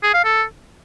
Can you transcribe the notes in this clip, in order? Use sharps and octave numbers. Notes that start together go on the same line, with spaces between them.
G#4
F5
A4